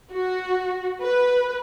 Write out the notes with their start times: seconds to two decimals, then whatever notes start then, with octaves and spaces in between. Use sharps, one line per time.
0.12 F#4
1.01 B4